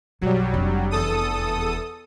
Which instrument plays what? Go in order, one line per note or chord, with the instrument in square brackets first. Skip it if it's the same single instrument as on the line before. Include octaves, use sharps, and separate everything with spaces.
[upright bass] B1 F#2 [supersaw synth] F#3 G3
[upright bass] F1 D4
[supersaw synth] E2 A4 D#6